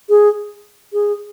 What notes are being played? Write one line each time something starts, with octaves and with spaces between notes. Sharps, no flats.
G#4
G#4